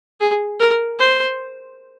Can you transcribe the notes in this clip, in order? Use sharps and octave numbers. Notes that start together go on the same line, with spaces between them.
G#4
A#4
C5